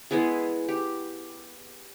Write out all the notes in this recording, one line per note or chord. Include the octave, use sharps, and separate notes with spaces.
G#3 B3 E4 G#4
G4